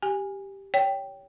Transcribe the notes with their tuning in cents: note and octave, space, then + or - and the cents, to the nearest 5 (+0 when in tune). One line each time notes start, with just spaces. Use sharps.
G4 +0 G#5 -15
C#5 +25 G5 +0